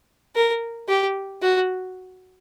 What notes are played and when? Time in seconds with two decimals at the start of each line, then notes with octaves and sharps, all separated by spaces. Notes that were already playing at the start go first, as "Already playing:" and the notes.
0.36 A#4
0.89 G4
1.42 F#4